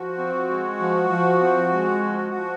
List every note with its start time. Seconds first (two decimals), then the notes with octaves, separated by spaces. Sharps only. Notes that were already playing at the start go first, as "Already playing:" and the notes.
Already playing: F3 F#4
0.18 C4
0.49 G#3
0.80 F3
1.10 F3
1.41 C4
1.72 G#3
2.03 F3
2.34 F3